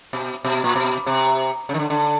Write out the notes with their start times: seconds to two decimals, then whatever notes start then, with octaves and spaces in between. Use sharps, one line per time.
0.13 B2
0.44 B2
0.64 A#2
0.76 B2
1.06 C3
1.69 C#3
1.74 D#3
1.79 D3
1.90 D3